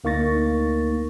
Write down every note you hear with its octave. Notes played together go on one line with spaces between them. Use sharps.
D2 A#3 D#4 C#6 A6 A#6